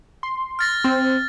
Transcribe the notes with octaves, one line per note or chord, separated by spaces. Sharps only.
C6
F6 A6 A#6
C4